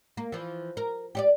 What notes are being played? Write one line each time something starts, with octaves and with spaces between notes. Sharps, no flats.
A#3
E3 F3
A#4
G4 C#5 D5